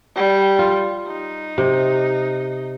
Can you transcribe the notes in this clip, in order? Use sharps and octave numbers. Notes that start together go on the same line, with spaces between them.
G3
F4
D#4
C3